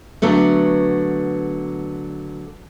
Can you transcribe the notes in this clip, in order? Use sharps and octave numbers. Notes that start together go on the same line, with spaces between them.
D3 F#3 A3 B3